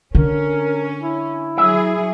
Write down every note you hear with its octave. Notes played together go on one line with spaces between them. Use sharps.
D3 C#4 A#4
E4
F#3 G#4 E5